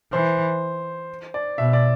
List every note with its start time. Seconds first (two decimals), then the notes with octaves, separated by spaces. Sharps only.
0.12 E3 C5
1.34 D5
1.58 B2 E5
1.73 D5